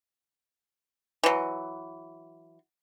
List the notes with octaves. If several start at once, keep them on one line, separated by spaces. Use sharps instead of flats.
E3 F#3